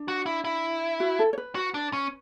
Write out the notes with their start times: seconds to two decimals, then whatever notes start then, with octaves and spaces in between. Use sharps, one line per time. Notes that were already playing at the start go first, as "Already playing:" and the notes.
Already playing: D4
0.08 F#4
0.26 E4
0.44 E4
1.00 F#4
1.19 A4
1.33 C#5
1.38 B4
1.55 F#4
1.74 D4
1.93 C#4